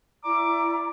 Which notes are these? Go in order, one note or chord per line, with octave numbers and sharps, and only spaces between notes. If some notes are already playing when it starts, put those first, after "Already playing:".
E4 D5 A#5 D6